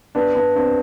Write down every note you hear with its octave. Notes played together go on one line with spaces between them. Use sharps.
B3 D4
B3 D4
C4 D4